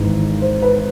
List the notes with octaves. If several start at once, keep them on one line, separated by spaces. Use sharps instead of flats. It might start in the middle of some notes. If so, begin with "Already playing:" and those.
Already playing: G#1 G#2 E3
C5
B4